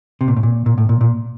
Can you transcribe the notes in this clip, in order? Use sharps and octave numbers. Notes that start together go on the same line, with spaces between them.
C3
A#2
A2
A#2
A#2
A2
A#2
A#2